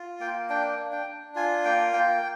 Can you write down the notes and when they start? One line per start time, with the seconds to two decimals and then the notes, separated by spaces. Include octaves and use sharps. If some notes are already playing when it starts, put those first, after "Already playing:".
Already playing: F4
0.20 A#3 G5
0.50 D4 G5
0.78 D4
0.92 G5
1.06 D4
1.35 F4 G#5
1.65 A#3 G5
1.93 A#3 G5